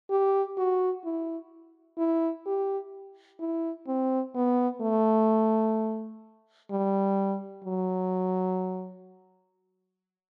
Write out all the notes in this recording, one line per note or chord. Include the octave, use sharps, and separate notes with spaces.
G4
F#4
E4
E4
G4
E4
C4
B3
A3
G3
F#3